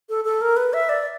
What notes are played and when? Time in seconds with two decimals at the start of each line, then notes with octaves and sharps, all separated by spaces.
0.09 A4
0.25 A4
0.41 A#4
0.56 B4
0.73 E5
0.89 D5